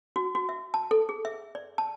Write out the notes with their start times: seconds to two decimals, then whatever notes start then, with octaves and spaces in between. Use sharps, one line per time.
0.16 F#4
0.35 F#4
0.49 E5
0.74 A5
0.91 A4
1.09 G#4
1.25 E5
1.55 D5
1.78 A5